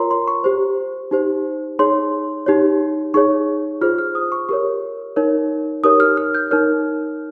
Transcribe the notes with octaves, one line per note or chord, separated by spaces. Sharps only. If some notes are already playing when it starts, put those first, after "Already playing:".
Already playing: F4 A#4 C#5 A#5 C6
C6
C#6
G4 C5
D#4 G4 C5
D#4 G#4 C#5 C6
D#4 G4 C#5
D#4 G#4 C#5 C#6
F4 G#4 C5 F6
F6
D#6
C#6
G4 A#4 C#5 C#6
D#4 A#4 C#5
D#4 G4 A#4 C#5 D#6
F6
F6
G6
D#4 A#4 C#5 F6